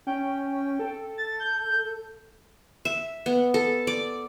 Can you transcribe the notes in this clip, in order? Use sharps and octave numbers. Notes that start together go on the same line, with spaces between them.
C#4 G5
A4
A6
G6
E5
B3
A4
D5